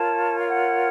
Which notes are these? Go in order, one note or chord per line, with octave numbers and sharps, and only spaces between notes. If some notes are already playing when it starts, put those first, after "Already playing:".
Already playing: F4 A#4 C#5 A5
F5
F#5